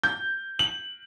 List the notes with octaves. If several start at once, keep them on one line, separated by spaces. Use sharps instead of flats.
G6
F#7